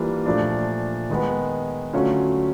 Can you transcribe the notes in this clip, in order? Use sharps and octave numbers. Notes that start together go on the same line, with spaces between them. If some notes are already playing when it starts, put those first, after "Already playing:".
Already playing: E3 G3 A#3 D4 F4
A#2 F3 A3 D4
D#3 G#3 B3
D3 F#3 A3 C#4 F4